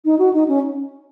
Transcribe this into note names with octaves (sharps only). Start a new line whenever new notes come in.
D#4
F#4
D#4
C#4